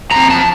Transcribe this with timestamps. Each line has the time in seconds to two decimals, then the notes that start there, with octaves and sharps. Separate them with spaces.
0.11 F3 C4 A#5
0.30 A5